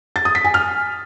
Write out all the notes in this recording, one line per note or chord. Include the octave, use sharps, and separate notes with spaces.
A6
D#6
B6
G#5
F6